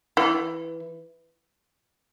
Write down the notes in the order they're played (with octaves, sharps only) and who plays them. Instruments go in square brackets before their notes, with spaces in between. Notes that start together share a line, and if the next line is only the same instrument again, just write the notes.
[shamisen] E3